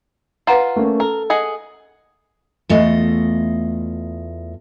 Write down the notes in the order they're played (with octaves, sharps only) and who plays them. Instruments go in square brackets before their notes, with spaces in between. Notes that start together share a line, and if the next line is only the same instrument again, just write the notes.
[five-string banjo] F4 [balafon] B4 F#5 A#5
[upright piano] A3 A#3 C#4
[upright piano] A4 [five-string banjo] A#4
[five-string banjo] G#4 D#5 F#5
[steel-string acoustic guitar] E2 A3 F4 D#5